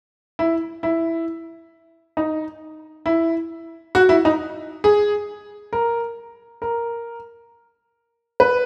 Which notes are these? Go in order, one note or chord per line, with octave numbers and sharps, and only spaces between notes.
E4
E4
D#4
E4
F#4
E4
D#4
G#4
A#4
A#4
B4